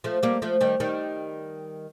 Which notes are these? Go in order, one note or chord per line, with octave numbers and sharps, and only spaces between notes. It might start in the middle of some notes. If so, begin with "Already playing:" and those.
F3 A3
G3 A#3
F3 A3
D#3 G3
D#3 G3